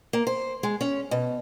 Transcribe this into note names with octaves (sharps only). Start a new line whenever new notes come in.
A#3
C5
G#3
C#4
B2